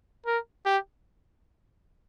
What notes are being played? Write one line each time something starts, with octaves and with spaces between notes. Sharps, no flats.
A#4
G4